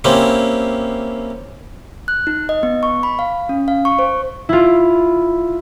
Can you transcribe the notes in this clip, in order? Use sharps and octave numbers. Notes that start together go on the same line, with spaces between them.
A#3 C4 C#4 E4 G4
F#6
D#4
D#5
B3
C#6
B5
F5
C#4
F5
C#6
C5
E4 F4